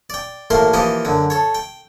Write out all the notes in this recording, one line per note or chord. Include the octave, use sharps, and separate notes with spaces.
D5 G5
A1 A2 A3 A#3 A#4 C6
E3 F3 A#3 G4 D#5
F#2 D3
A4 C#5
G5